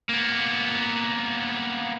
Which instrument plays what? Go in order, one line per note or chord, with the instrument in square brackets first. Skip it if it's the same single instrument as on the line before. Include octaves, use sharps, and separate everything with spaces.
[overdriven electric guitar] A#3 B3